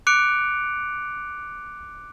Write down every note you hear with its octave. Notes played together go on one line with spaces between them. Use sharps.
D6 F#6 C#7 D7 F7